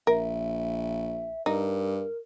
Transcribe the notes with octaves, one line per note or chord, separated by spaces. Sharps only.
A#1 A#4 E5
G2 D#4 A#4